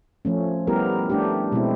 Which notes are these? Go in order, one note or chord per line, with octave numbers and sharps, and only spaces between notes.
F3 A3 C#4
G3 B3 E4 G4 A#4
A3 D4 G4
B2 G#3 C4 E4